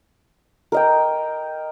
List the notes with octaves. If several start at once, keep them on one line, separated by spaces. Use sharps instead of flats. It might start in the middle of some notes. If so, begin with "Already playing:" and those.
A#4 D#5 G5